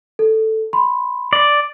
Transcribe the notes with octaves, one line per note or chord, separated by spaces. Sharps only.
A4
B5 C6
D5